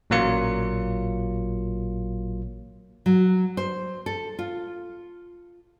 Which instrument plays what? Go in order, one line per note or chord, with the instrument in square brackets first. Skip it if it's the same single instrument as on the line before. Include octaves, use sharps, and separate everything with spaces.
[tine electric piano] A1 A#2 F#3 A#3 F4 C#7
[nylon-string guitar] F#3
C5
A4
F4